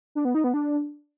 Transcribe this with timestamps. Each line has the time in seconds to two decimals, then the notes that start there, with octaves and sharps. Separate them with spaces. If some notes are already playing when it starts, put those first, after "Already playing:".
0.15 D4
0.25 B3
0.35 D#4
0.44 B3
0.54 D4